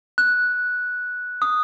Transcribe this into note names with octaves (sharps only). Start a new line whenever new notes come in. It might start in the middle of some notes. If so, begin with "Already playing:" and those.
F#6
D#6